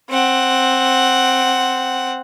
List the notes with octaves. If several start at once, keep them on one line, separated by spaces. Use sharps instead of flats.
C4 F#5